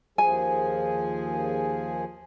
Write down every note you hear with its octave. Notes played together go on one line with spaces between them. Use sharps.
D#2 F3 G#4 G#5